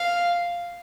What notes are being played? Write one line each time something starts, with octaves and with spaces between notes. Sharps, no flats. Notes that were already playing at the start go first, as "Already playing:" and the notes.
Already playing: F5